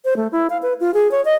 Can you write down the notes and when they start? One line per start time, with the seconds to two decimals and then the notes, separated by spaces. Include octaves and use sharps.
0.05 C5
0.17 A3
0.32 E4
0.50 F5
0.62 B4
0.80 F4
0.94 G#4
1.11 C#5
1.25 D#5